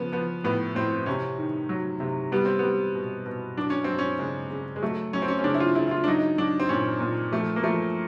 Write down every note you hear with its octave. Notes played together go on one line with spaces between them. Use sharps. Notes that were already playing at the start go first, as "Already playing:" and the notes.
Already playing: C#3 F3 B3
F3 B3
A2 B3
A2 C4
C3 C#4
D#3
F#3
C3
G3 B3
C4
G3 B3
B2
B2
F#3 D4
C#4
F#3 C4
C#4
C#3 G#3
C#3
G#3
F#3 A3
F#3 C#4
C4
C#4
C#4
C#3 D4
E4
F4
C#3 E4
E4
F4
D4
F#3 D#4
F#3 D4
C4
A#2 C#4
A#2
F3 A3
A#3
F3 A3